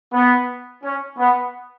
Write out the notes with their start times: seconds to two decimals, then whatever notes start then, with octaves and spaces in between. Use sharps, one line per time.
0.13 B3
0.83 C#4
1.18 B3